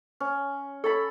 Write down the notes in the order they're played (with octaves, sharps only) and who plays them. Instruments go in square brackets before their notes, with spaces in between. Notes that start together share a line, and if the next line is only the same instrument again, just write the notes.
[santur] C#4
[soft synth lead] A4 [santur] C#5 A5 B5